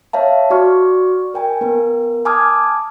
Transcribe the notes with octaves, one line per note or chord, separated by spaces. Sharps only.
C#5 E5 F5 A5
F#4 D5 C#6 F6
A#4 G5 G#5
B3 A#4
G#5 A5 D6 D#6 F6 G#6